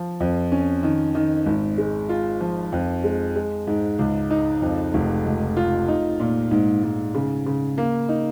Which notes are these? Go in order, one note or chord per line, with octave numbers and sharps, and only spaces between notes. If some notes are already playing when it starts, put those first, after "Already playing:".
Already playing: F3
F2
C#4
D#3
D#3
G#1
G#3
F4
F3
F2
G#3
G#3
G#2
C#2
D#4
F2
F1
C#2
F4
D#4
A#2
G#2
G#2
C#3
C#3
A#3
D#4